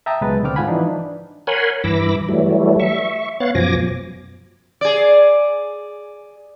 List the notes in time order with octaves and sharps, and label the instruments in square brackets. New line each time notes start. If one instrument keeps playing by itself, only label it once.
[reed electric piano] E5 G5 A5 A#5 D#6
C#2 B2 F#3 G#3 B4 A6
C#2 D3 C4 G5 D6 F6
G#2 F4 F#5 G#5 B5
E3 F3 D4 D#4
[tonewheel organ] A#4 C#5 F#5 G#5 B5 C6
G2 E3 B5 D6 E6 A#6
E3 F#3 G3 A3
E5 C#6
B3 C#5 F5 F#6 A6
F#2 B2 F3 G#5 D6 A#6
[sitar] G#4 D5